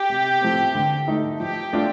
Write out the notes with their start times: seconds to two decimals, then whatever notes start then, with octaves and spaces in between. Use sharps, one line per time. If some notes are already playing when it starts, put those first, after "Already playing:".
Already playing: G4
0.10 C3
0.42 F3 A3 C4
0.75 D3
1.08 A3 D#4
1.40 F3 G4
1.73 A3 D4 F4